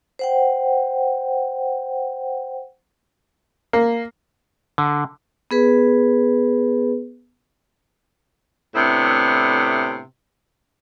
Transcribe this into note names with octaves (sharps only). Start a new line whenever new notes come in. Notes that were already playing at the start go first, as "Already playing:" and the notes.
C5 F#5 G5
A#3
D3
B3 G#4 B4
A2 C3 B3 D4 E4